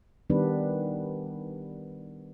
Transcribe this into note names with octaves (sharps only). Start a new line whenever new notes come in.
D#3 G3 B3 D4 B4